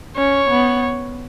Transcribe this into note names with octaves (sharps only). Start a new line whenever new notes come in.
C#4 C#5
B3